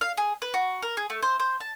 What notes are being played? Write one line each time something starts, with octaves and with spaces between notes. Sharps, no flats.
F5
G#4
B4
F#4
A#4
G#4
A3
C5
C5
A5